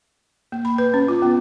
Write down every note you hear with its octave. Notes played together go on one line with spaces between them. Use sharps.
A#3
B5
B4
C#4
F4
B3